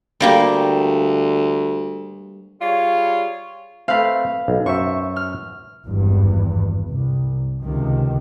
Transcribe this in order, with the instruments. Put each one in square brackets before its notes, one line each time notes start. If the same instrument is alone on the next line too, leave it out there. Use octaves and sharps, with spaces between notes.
[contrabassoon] D2 [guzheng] G3 A#3 G4
[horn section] G3 F4 G#4 C#5
[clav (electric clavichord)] A3 C4 [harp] B4 F5
[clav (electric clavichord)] B1
[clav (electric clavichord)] F#2 C5 E5 [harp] C#6
[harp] F6
[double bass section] G#1 E2 G2
C2
C#2 C3 D#3